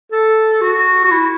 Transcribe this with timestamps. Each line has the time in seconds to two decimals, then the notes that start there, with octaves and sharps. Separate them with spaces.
0.12 A4
0.61 F#4
1.05 F#4
1.11 E4